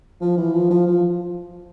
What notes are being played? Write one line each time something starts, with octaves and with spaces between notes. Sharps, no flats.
F3
E3
F3
F3
F3